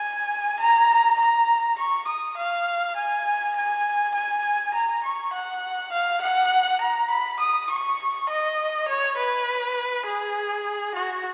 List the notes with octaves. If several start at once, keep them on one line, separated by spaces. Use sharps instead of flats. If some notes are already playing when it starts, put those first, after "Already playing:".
Already playing: G#5
A#5
A#5
C#6
D#6
F5
G#5
G#5
G#5
A#5
C#6
F#5
F5
F#5
A#5
B5
D#6
C#6
D#5
C#5
B4
G#4
F#4